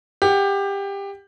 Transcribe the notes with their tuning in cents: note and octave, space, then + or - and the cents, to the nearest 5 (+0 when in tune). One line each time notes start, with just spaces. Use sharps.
G4 +20 F#5 +25